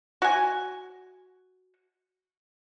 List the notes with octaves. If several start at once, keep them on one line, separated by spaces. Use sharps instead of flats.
F#4 G#5